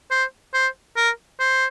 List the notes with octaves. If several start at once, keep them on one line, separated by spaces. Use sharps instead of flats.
C5
C5
A#4
C5